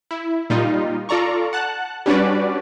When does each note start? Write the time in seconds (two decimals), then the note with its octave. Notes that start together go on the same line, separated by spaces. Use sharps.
0.11 E4
0.50 A#2 G3 D#4 F4
1.09 F4 A4 D5 A#5 C#6
1.53 F#5 A5 F#6
2.06 G3 C#4 D4 F#4 B4 D5